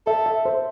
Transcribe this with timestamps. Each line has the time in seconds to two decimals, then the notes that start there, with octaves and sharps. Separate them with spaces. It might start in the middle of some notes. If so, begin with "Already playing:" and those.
0.06 A4 E5
0.26 E5
0.45 C5